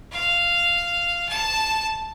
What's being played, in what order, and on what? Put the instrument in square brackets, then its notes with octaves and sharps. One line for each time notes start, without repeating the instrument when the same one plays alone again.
[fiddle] F5
A5